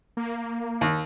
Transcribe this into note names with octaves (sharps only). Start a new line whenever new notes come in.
A#3
D#2